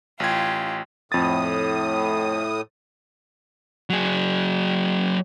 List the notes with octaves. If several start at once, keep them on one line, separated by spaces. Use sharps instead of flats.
A1 F4 G4 G#6
F2 A2 D#6 A6
F#3 G#4